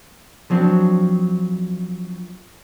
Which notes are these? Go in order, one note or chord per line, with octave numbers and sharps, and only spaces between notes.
F3 F#3 C4 D4